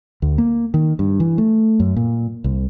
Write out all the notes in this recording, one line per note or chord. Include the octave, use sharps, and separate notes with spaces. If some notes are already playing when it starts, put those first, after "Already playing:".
D2
A#3
D#3
G2
E3
A3
F#2
A#2
C2